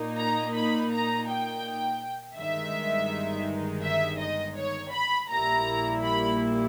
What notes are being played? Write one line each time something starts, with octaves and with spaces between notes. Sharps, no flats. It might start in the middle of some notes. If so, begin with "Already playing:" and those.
Already playing: A#2 A#3 D#4
A#5
B5
A#5
G5
G1 G2 D#3 G#3 D#4 E5
E5
D#5
C#5
B5
A#1 A#2 G3 A#3 E4 A#5
B5